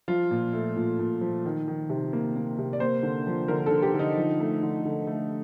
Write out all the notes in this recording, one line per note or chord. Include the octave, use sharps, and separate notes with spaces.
F3 F4
A#2
A3
A#2
A#2
F3
D#3
D#3
C3
A#3
A#3
C3
D5
A#3 C5
D3
F3
D3 A#4
A4
D3
G4
D3
D#4
F3
A3
D3
D3
A3